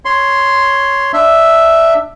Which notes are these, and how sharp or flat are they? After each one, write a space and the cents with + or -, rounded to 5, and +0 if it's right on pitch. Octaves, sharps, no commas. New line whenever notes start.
C#5 +0 C6 +0
D4 +20 E5 +0